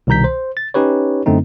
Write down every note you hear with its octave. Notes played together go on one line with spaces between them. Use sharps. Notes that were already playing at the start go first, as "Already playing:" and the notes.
C2 B2 D#3 A#5 G6 B6
C5
A6
C#4 D#4 G4 B4 C#5
F#2 D3 A3 C4 D#4